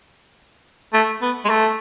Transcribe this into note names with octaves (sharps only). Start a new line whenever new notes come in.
A3
B3
G#3
A3